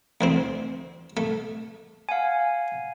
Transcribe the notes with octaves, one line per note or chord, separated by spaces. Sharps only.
D2 E3 C4
A3
F5 F#5 G#5